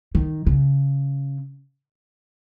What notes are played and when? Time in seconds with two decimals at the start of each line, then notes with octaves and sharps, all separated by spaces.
0.15 D#3
0.46 C#3